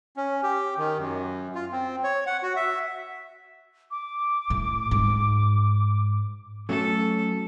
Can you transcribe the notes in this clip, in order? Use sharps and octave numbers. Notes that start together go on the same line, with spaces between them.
C#4
G4
D#3
F#2
F4
C4
C#5
F#5
F#4
E5
D6
A2
G#2
F#3 A3 C#4 A4